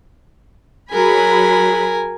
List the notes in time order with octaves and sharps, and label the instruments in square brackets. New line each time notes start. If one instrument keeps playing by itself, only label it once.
[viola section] F#3 G#4 B5 [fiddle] A#4 G#5